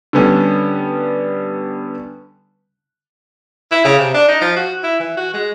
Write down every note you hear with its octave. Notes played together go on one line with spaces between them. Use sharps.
D3 G3 B3 C#4
E4
C#3
C3
D4
D#4
F3
F#4
E4
E3
F#4
G#3